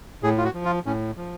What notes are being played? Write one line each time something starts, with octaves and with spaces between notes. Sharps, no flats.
A2 G#4
F4
F#4
F3
F4
A2 C#4
F3